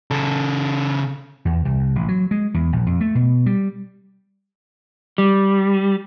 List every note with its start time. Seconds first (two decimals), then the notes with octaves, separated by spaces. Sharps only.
0.11 C#3 A4
1.45 E2
1.65 C2
1.96 A1
2.08 F#3
2.31 G#3
2.54 E2
2.73 A#1
2.86 F2
3.01 A3
3.15 B2
3.46 G3
5.18 G3